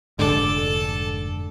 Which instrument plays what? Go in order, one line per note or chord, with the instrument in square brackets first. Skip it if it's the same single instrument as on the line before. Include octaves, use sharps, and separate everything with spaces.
[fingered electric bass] F1 G#2 [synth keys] D3 D6 [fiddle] A4